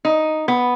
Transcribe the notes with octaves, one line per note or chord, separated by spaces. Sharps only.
D#4
B3